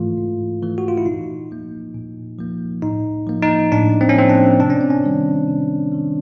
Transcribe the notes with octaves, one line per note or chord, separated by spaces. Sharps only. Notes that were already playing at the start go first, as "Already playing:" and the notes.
Already playing: G#2 E3 A3 F4
G#2
E3 A3
F#4
F4
E4
A#2 D#4
F3 A#3
A#2
F3 A#3
A2 D#4
F3 A#3
D#4
A2 D4
C4
C#4
F3 A#3 C4
D4
C3 D4
C#4
C4
C#4
D#3 G3
C3
D#3 G3